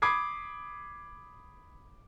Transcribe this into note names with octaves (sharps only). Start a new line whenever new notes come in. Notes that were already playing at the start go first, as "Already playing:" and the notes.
B5 D6 D#6 G#6 C7